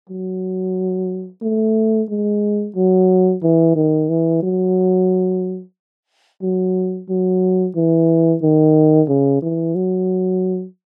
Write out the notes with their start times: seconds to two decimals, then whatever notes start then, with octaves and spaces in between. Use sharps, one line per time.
0.10 F#3
1.43 A3
2.09 G#3
2.76 F#3
3.43 E3
3.76 D#3
4.09 E3
4.43 F#3
6.42 F#3
7.09 F#3
7.76 E3
8.42 D#3
9.09 C#3
9.42 E3
9.75 F#3